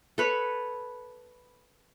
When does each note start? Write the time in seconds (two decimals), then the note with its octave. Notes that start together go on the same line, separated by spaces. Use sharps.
0.18 A4 B4 C#5